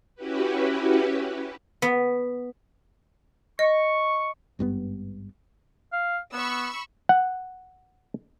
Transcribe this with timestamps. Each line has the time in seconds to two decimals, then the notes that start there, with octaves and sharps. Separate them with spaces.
0.15 C#4 E4 F#4 G4 B4
1.82 B3
3.59 D#5 C#6
4.59 G#1 G2 C#3 B3
5.93 F5
6.34 B3 B5 C#6 E6
7.09 F#5